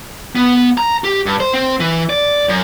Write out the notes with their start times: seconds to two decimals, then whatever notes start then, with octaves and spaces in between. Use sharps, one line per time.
0.36 B3
0.78 A#5
1.04 G4
1.26 G2
1.40 C5
1.53 C4
1.80 E3
2.10 D5
2.49 F#2